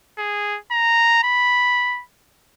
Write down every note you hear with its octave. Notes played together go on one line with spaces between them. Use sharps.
G#4
A#5
B5